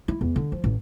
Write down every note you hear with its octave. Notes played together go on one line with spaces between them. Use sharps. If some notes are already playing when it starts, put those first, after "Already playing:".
E4
E2
D3
F3
A1